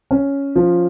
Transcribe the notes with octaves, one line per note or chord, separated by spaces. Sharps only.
C#4
F3